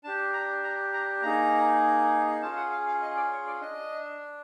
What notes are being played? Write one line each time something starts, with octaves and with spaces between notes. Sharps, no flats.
D4 G4 A5
A#5
A#5
A#5
A#3 D#4 G#4 A#5
C#4 F4 G#4 A5
F#5
F5
F5
D#5
D5
C#5
D5
D4 D#5